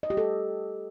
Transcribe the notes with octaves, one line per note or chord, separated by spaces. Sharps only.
D#5
G4
A4